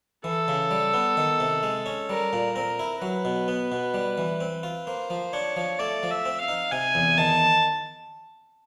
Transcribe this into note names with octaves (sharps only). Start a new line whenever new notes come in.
E3 A4
C#3
G3
B3
D#3
C3
G#3
C#4
G3 A#4
A#2
C4 A#4
E4
F#3 B4
B2
B3
B2
G3
E3
C4
F4
A#3 C5
F3
D4 C#5
F3
A3 D5
F3
E5
C4
F5
D#4
C3 G#5
E2
D#3 A5